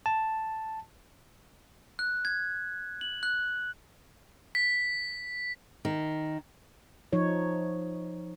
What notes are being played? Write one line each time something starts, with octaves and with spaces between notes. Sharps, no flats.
A5
F#6
G#6
F#7
F#6
B6
D#3
F3 D#4 C#5